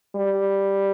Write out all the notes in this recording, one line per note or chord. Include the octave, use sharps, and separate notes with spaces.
G3